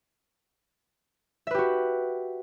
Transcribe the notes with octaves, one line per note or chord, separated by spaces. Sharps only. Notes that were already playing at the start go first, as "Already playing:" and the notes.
F#4 G4 B4 E5